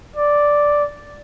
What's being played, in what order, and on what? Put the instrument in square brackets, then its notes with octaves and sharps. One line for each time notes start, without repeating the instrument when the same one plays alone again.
[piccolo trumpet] D5